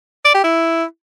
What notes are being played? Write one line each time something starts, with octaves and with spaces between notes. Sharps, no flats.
D5
G4
E4